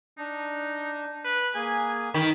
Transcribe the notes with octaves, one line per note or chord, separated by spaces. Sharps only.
D4 D#4
B4
A#3 G#4 G#5
G2 D#3 B5